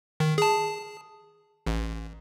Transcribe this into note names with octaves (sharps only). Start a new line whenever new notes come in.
D#3
G#4 A5
A1